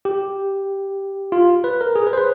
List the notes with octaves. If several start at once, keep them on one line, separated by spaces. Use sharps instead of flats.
G4
F4
B4
A#4
G#4
B4
C5
B4